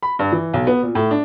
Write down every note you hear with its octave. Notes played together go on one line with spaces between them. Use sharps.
B5
G2
E3
B1
B3
A#2
A2
D4